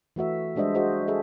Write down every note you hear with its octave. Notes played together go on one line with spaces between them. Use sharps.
E3 A3 F#4 E5
G3 G#3 D4 C5 D#5 E5
F#4 G#4 C5 D#5 F5
G#4 A4 E5